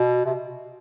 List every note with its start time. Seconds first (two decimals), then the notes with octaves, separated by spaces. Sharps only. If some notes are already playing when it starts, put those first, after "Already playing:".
Already playing: B2
0.26 C3